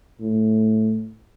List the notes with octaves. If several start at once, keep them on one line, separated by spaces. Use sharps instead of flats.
A2